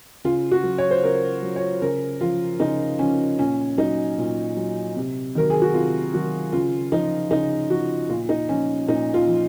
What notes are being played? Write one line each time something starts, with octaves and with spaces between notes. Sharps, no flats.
C#3 F4
F#4
F#3
C#5
C5
C#3 A#4
F#3
C#5
C#3 A#4
F3 F4
C#3 D#4
F3 C#4
A#2 C#4
F#3 D#4
A#2
F#3
C3
D#3 F#3 A#4
G#4
F#4
C3 F4
D#3 F#3 F#4
C#3 F4
F3 D#4
C#3 D#4
F3 F#4
A#2 F4
D#4
F3 C#4
A#2 D#4
F4
F3